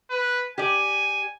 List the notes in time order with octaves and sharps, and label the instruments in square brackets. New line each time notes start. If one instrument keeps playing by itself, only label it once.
[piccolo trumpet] B4
[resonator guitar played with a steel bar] G4 D5 [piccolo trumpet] G#5